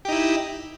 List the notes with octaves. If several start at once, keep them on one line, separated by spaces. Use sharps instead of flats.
D#4 E4 G4